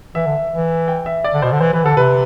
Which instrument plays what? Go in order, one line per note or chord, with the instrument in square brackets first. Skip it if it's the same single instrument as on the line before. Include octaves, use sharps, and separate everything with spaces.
[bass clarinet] E3 [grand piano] E5
[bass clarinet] D3
E3
[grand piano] G5
E5
D5
[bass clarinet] D3
[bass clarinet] B2 [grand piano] C5
[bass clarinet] D3
[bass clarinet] E3 [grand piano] C5
[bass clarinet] E3 [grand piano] B4
[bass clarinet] D3 [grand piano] A4
[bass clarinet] C3 [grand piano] B4